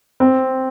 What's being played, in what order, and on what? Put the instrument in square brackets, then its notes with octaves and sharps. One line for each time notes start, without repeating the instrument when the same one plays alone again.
[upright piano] C4